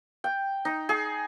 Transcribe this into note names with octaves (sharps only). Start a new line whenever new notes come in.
G5
D#4
G#4